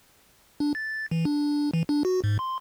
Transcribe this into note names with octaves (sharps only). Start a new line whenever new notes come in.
D4
A6
E3
D4
E3
D4
F#4
G#2
C6